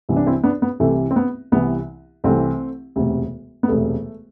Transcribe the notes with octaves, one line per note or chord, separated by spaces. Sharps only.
C2 C3 E3
D4
C4 E4
B3 D4
B3
C2 C3 E3 A3
C4
B3
C2 C3 E3 B3
C2 C3 E3 A3 C4
E1 D2 C3
B3
E1 D2 C3 A3